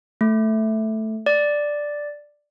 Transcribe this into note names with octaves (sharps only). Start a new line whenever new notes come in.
A3
D5